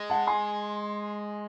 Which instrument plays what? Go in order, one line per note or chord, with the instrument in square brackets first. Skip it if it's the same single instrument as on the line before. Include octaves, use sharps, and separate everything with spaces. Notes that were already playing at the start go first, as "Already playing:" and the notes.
Already playing: [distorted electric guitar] G#3
[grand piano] F#5 A5
G#5 C6